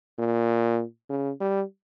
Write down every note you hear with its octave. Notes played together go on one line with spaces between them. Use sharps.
A#2
C#3
G3